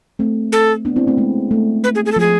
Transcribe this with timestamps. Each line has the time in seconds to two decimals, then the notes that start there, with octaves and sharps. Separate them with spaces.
0.19 A3 C4
0.52 A4
0.85 B3 D4
0.96 C4 E4
1.07 A3 C4
1.18 G#3 B3
1.51 A3
1.84 B4
1.95 G#4
2.06 G#4
2.12 A4
2.16 F3
2.20 G#4